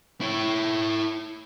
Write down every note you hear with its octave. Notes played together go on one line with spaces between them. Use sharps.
E4 C#5